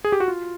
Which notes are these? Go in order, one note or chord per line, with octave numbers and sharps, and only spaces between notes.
G#4
G4
F#4
F4